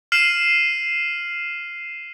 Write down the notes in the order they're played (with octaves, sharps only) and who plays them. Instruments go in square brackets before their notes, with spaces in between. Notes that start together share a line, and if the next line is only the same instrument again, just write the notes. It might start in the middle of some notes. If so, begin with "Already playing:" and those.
[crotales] F6 C7 D#7 E7 F#7